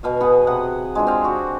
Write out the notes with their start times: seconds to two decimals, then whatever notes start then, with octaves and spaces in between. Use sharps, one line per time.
0.03 B2 F5 G#5
0.21 B3 G#4 F#5
0.47 C3 F#5
0.95 G#3 D4 F4
1.07 C4 F5
1.24 F#4 G4